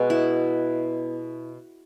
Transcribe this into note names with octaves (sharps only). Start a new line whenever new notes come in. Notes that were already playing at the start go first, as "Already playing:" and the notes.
Already playing: B2 G#3 B3 F#4
E4